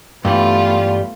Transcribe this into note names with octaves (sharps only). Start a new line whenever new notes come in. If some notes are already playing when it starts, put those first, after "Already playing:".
G2 E3 G3 A3 B3 F4